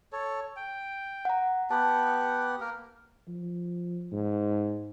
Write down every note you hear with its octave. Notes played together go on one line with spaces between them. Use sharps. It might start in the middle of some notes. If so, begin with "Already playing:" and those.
A4 C#5
G5
F#5 A#5
B3 G4 F#5 A5
A#3 A#4
F3
G#2